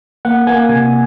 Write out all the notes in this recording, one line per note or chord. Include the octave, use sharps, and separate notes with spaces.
A#3 F#5
A#3 G#5
C3 G#5